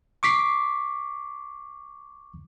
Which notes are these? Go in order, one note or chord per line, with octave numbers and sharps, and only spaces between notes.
C#6 D6 B6 C7